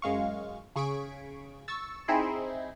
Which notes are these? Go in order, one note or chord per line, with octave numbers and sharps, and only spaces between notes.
F#2 G#3 F5 C#6
C#3 G#4 C#6 G#6 B6 D7
C#6 E6 A6
C4 D#4 E4 G#4 C6